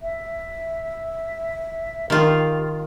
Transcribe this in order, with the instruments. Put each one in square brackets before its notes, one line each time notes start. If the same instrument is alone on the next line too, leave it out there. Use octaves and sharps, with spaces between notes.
[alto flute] E5
[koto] D#3 F4 [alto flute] G4